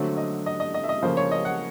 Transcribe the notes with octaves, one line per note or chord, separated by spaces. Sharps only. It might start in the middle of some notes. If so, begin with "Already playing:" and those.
Already playing: D3 F#3 A3 C4
D#5
D#5
D#5
D#5
E5
D#5
C#3 F3 A#3 C5
C#5
D#5
F#5